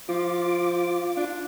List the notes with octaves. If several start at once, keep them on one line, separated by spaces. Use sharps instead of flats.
F3 F4 D6
D4